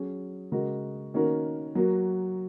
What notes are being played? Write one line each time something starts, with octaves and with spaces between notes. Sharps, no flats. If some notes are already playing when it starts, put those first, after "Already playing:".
Already playing: F#3 C#4 G#4
C#3 G#3 F#4 A#4
D#3 A#3 C#4 F#4 A#4
F#3 A#3 F#4